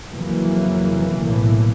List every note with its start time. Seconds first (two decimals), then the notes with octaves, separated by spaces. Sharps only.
0.11 F2 C#3 E3 F#3 A#3
1.20 B1 A2 E3 A#3